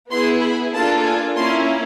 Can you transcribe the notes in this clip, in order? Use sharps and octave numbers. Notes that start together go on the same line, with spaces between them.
B3 E4 G#4 C6
B5
A#3 D4 F4 A4 A5
G#5
A#3 C#4 E4 C6